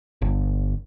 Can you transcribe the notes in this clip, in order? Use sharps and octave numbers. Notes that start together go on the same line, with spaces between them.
G1